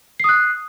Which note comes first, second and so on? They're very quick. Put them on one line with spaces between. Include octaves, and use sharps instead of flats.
C7 D#6 F#6